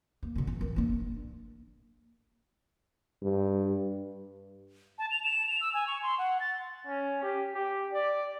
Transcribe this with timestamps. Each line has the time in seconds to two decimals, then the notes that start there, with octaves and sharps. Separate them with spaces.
0.23 A#3
0.35 B2 D3
0.47 E2
0.61 D#3 E3
0.76 A#3 D4
3.23 G2
4.99 A5
5.11 F7
5.24 E7
5.48 F7
5.61 E6
5.74 G#5
5.87 C#6
6.03 C6
6.18 F#5
6.40 A6
6.87 C#4
7.23 G4
7.55 G4
7.93 D5